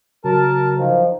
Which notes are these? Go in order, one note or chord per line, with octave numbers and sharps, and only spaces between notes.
C#3 F#3 A#4 A5
D#3 F3